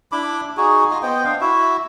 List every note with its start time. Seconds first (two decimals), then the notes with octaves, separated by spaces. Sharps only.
0.12 D4 E4 B5 D6
0.57 D#4 F#4 G#4
0.91 F4 D#5
1.03 B3 C5 D#5 G5
1.24 D4 F5
1.41 E4 F#4 E5